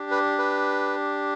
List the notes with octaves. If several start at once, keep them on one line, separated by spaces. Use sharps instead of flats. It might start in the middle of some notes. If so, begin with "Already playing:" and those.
Already playing: D4 G4
B4
B4